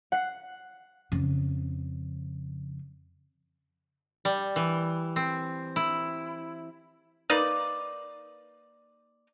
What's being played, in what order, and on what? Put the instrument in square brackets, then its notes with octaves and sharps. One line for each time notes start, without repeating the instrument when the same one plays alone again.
[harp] F#5 C7
[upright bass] F2 C#3
[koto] G3
E3
C4
E4
[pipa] A#3 D#4 B4 D5